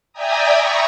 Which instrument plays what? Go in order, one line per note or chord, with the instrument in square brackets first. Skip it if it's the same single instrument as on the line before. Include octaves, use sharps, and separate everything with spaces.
[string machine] D5 E5 G5 G#5 A#5 D#6
A#5 B5 C#6 E6 G#6